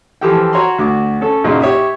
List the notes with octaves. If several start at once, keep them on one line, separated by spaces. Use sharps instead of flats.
E3 F3 G4 A4 G5
F#4 C#5 A#5 C6
D2 F#4 D6
C#4 A4
F#2 A#2 C#3 A#3 D#4 F4
G4 C#5 E5 D#6